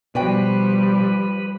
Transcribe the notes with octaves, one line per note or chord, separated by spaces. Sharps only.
B2 F3 G3 D4 F#4 B4 G5